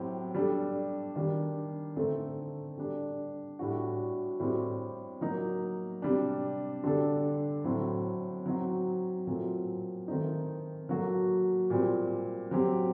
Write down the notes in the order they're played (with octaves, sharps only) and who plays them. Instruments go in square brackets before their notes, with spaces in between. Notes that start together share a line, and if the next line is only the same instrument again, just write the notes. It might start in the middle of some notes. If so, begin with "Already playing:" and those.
Already playing: [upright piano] A2 F#3 C4 G4
G3 D4 A4
D#3 G3 D4
D3 A3 C4 D#4 A4
G3 D4 A4
A2 G3 D4 F#4
A2 G3 C4 G4
F#3 A#3 D#4
C3 G3 D4
D3 G3 D4 A4
A2 F#3 C4
F#3 C4 D#4 F#4
A#2 F#3 A3 C4
D#3 A3 C4 D#4
F#3 A#3 F#4 A4
A#2 G3 C4
F#3 C4 G4